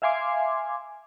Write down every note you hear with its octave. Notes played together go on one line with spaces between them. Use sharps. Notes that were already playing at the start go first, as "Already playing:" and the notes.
E5 F5 G#5 C6 D6